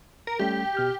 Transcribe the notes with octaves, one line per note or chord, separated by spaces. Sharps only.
A#4
G3 A3 C#4 G4
B2 F6 G6